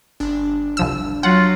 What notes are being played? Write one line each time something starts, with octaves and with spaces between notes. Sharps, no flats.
G1 D4
C2 F3 E6
F#3 F4 F#5